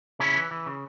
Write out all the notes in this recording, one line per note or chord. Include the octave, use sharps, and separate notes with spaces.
C#3 C#4 E4
E3
E3
C#3